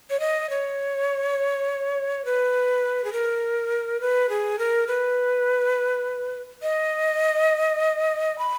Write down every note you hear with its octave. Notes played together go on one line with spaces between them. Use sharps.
C#5
D#5
C#5
B4
G#4
A#4
B4
G#4
A#4
B4
D#5
B5